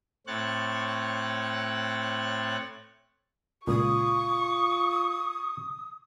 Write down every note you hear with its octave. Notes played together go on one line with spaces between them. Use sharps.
A2 C4 C#5 F#6 A6
C#2 A#2 F4 C#6 D#6